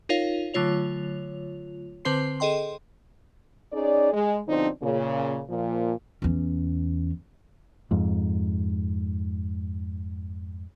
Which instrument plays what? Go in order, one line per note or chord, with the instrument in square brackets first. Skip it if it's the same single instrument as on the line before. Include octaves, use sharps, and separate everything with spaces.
[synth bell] D#4 F4 A#4 C#5 F5
D3 F#3 A3 F4 C#5 F7
D3 C4 B4 C5 C6 C7
G#4 A4 D#5 G5 C6
[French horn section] C#4 D#4 G#4 D5
G#3
B2 D3 F3 C4 D4 D#4
A#2 C#3
A#2 F3
[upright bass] E2 C#4
[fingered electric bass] F2 G#2